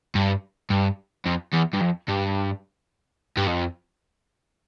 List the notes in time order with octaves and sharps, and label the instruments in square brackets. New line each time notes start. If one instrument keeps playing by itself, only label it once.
[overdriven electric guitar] G2
G2
F2
E2
G2
F2
G2
G2
F2